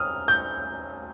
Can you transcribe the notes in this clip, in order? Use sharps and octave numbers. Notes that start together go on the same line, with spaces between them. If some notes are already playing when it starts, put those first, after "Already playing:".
Already playing: D#6 F6
G6